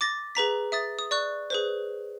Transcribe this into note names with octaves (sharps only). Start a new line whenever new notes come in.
D6 A6 A#6
G#4 B4 A#5 B6
E5 D#6 A6
D#6
D5 C#6 F#6
G#4 B4 C5